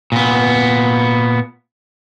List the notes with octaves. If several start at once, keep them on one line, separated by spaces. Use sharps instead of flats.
A#2 B3